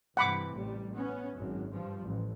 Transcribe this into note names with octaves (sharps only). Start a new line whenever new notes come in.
G2 C3 E3 F#5 B5 D6
A1 G3
B3 C#4
G#1 F#2
G2 F3 G3
A1